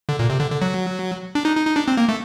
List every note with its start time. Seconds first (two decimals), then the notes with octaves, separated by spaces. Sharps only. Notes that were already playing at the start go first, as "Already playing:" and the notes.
0.09 D3
0.19 A#2
0.30 C3
0.40 D3
0.50 D3
0.62 F#3
1.35 D4
1.45 D#4
1.56 D#4
1.67 D#4
1.76 D4
1.88 C4
1.97 A#3
2.09 A3